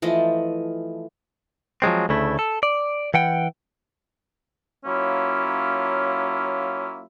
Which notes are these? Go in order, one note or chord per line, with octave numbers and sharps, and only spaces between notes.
E3 F3 A3 D#5
F3 F#3 G#3 C4
D2 C#3 A3 E4
A4
D5
E3 F#5 G5
F#3 A#3 C#4 E4 F4